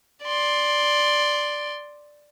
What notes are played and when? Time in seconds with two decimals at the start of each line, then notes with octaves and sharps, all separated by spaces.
0.24 D5 C6